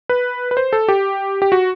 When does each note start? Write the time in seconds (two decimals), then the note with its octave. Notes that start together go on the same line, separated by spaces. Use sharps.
0.09 B4
0.51 B4
0.57 C5
0.73 A4
0.88 G4
1.42 G4
1.52 F#4